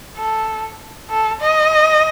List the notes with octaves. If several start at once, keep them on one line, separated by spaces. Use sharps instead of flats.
A4
A4
D#5